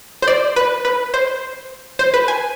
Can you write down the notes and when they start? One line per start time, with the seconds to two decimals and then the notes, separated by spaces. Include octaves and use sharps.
0.22 C5
0.28 D5
0.56 B4
0.85 B4
1.14 C5
1.99 C5
2.14 B4
2.28 G#5